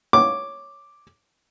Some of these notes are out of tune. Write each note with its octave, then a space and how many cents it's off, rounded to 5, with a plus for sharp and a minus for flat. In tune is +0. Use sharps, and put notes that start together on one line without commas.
C#5 +0 D6 +0